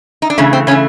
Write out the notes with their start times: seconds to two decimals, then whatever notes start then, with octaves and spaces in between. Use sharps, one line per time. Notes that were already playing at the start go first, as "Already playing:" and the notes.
0.22 D#4
0.30 D4
0.38 C#3 E3 A3 C#4
0.53 C4
0.67 C#3 E3 A3 C#4